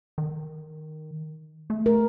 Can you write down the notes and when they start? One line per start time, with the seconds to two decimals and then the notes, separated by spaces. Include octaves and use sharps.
0.18 D#3
1.70 A3
1.86 A#4